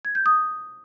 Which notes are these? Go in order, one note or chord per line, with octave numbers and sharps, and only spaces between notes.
G#6
G6
D#6